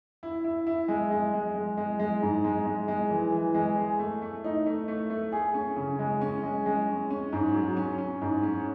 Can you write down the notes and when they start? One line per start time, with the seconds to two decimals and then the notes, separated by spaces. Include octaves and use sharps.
0.23 E4
0.44 E4
0.67 E4
0.88 G#3
1.11 G#3
1.34 G#3
1.55 G#3
1.77 G#3
1.99 G#3
2.22 G#2
2.44 G#3
2.66 G#3
2.88 G#3
3.10 E3
3.32 E3
3.54 G#3
3.77 G#4
3.99 A3
4.22 A3
4.44 D#4
4.66 A3
4.88 A3
5.10 A3
5.32 G#4
5.54 C#4
5.76 C#3
5.99 G#3
6.21 C#4
6.43 G#3
6.66 G#3
6.88 C#4
7.10 C#4
7.33 G#2
7.55 F#3
7.77 C#4
7.98 C#4
8.21 G#2
8.43 C#4